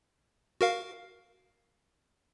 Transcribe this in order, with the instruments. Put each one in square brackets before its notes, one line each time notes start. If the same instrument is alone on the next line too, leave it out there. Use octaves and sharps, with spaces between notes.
[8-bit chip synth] F#4 A#4 F5